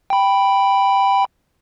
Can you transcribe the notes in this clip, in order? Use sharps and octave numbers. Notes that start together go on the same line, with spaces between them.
G5 B5